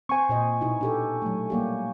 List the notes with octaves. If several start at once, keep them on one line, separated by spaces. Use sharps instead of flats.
C4 C5 G#5 C#6
A#2 C5 D#5
B2 D#4 E4
D4 G4 A4
F#3 A3
G3 A#3 G4